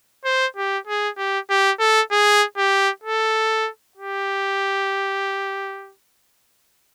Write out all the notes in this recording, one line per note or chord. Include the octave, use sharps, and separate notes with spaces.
C5
G4
G#4
G4
G4
A4
G#4
G4
A4
G4